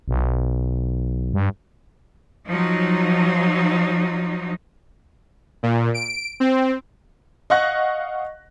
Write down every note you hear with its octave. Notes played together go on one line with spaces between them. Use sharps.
B1
G2
F3 F#3 D#4
A#2
D7
C4
D#5 F5 F#5 C#6 F#6 A#6